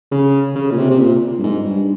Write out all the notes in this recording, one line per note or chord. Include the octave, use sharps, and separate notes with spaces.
C#3
C#3
A#2
C3
C3
A#2
G2
G#2
G2